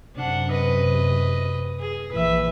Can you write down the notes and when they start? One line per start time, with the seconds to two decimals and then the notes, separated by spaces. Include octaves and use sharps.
0.15 F#2 C3 D4 F#5
0.51 B4 D#5
1.79 G#4
2.12 A#1 E3 B4 E5